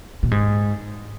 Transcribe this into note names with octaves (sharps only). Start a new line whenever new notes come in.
A#2
G#2